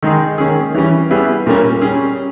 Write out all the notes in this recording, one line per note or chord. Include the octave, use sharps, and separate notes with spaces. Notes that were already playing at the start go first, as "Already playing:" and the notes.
D#3 G#3 D#4 G#4
D#3 A#3 C#4 G#4
E3 G3 C#4
G3 B3 E4 G#4
A#2 G3 A#3 C#4
G3 C#4 G#4